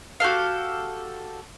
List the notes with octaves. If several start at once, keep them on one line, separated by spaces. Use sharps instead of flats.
F#4 G4 A4 F5